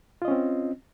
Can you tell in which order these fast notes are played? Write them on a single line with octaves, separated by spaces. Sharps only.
F4 D#5 C#4 C4